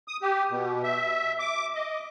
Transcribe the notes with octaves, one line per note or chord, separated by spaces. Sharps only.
D#6
G4
B2
E5
D6
D#5